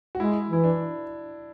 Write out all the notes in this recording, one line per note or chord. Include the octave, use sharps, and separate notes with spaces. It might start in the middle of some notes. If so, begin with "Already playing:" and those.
F#4
G#3 E4
E3 E4
D4